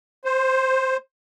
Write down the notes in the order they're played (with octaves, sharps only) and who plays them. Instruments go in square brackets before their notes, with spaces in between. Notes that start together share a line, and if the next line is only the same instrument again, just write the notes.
[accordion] C5